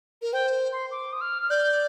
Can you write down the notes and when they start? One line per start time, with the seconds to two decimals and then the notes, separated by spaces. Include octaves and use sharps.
0.22 A#4
0.33 C5 G5
0.72 C6
0.91 D6
1.12 D#6
1.21 F6
1.42 F6
1.50 D5 G6